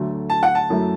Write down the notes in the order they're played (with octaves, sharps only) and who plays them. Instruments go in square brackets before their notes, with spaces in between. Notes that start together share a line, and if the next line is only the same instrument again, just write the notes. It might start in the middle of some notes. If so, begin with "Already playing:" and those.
Already playing: [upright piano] D2 D3 F#3 A3
[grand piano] A5
F#5
A5
[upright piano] F#2 F#3 A3 E4